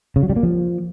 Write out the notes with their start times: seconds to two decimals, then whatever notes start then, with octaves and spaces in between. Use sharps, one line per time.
0.16 C#3
0.23 F#3
0.30 G3
0.36 A#3
0.43 F3